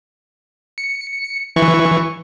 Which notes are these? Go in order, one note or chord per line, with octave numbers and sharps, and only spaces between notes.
C#7
E3 C#6